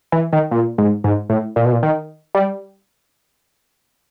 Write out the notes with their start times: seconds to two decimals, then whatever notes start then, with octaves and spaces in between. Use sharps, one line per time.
0.12 E3
0.33 D#3
0.51 A#2
0.78 G#2
1.04 G#2
1.30 A2
1.56 A#2
1.65 B2
1.72 A#2
1.83 D#3
2.35 G3